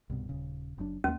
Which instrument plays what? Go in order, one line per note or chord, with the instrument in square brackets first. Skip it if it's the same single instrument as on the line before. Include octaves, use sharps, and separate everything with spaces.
[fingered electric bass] C2 G2 B2
D#1 C#3
F#1 F#2 D4
[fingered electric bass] D#2 A#3 [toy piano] C#4